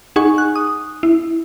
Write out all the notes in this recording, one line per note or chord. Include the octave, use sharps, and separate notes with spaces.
D#4 G#4 F#5 G#5 C#6
F#6
D#6
E4